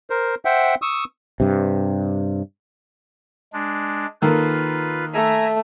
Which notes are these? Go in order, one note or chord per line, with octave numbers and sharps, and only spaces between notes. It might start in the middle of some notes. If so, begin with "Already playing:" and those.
A#4 C5
C5 E5 F#5 G5
C#6 D#6 E6
G2 C3
G#3 D4
D#3 A#3 F4 A4 B4
A3 E5 G#5 A#5